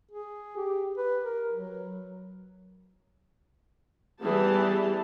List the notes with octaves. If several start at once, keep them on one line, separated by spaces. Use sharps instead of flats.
G#4
G4
B4
A#4
F#3
E3 G3 B3 G4 G#4 A5